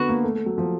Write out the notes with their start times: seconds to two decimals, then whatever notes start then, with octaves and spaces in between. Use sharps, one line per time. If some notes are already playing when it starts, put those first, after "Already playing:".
Already playing: D3 B3 F#4
0.09 A#3
0.23 A3
0.35 A3
0.46 F#3
0.58 F3